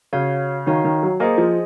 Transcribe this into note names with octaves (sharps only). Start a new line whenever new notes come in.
C#3 F#4 C#5 F5
D#3 F#4 C#5 F5
D#3
F#3
A#3 G#4 C5 D#5 G#5
F3